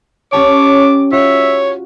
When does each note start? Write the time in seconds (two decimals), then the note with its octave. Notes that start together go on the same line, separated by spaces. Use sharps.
0.32 C#4 G4 C#5 A5 D6
1.12 F4 F#4 C#5 E5